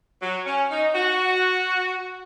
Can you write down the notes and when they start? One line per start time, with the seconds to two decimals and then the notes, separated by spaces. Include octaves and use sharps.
0.22 F#3
0.46 C#4
0.70 D#4
0.94 F#4